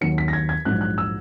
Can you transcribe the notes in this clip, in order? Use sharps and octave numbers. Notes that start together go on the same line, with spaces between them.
D#2 D#3 F#3 C#7
B6
A#6
G#6
G#6
A#1 G#2 F#3 F#6
F#6
E6